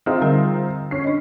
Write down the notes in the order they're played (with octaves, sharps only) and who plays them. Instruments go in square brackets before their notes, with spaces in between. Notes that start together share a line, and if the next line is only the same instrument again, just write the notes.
[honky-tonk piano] C4 D#4 F4 [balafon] G#4 E5
[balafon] D3 G3 A#4
[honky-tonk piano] C#4 C7
[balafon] D4 D#5